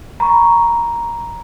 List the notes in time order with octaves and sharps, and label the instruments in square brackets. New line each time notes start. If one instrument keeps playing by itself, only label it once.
[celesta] A#5 B5 C#6